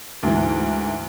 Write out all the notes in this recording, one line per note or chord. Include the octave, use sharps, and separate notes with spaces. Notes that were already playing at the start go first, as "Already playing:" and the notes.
D2 G#2 E3